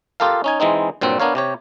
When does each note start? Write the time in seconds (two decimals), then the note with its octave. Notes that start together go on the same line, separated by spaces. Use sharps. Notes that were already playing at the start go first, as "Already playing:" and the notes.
0.20 F4 G4 A4 A#4 F5
0.44 C#4 D#4 G#5
0.60 E3 G#3 C4 D#4
1.01 G2 A#2 F#3 C4
1.20 B3 D4 A#4 C#5 F5
1.35 C3 G4 C#5